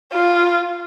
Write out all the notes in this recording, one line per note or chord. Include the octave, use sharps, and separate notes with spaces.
F4